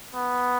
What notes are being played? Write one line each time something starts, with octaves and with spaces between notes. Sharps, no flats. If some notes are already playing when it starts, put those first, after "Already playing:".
B3